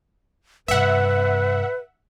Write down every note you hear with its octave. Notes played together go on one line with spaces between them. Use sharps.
G2 C3 B4 E5 F#5